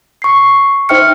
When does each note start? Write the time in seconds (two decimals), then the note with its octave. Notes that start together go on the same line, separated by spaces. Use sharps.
0.22 C#6 C7
0.89 D#4 C5 E5 G5 F6 C#7